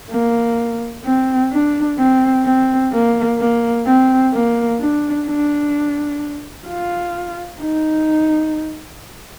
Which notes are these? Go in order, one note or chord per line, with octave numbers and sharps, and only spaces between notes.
A#3
C4
D4
C4
C4
A#3
A#3
C4
A#3
D4
D4
F4
D#4